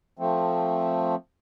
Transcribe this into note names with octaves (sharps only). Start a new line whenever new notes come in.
F3 A3 C4